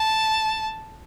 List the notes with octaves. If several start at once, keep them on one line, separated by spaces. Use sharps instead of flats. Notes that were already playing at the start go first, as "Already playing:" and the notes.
Already playing: A5